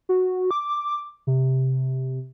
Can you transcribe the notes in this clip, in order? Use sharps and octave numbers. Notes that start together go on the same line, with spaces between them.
F#4
D6
C3